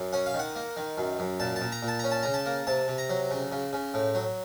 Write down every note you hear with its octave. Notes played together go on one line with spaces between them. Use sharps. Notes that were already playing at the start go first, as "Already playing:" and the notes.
Already playing: F#2
C#4 F#5
F5
D#3
F#5
A#3
D#3
F#2
F#2
A#2 A5
A5
A#2
A#5
A#2
A5
C#4 A#5
A5
C#3 A#5
A5
A#3
C3 A5
C3
A#5
F#3
C#3
C#3
C#3
A2
F#3